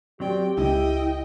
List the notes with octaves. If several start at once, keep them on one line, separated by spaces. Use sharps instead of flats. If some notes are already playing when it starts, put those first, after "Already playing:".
F#3 C4 G4 D5 G5
C#2 E4 D#5 G5